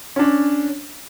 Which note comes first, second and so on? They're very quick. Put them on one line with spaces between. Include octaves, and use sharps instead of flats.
C#4 D4 C#5